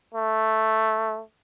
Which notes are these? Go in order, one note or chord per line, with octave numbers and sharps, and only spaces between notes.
A3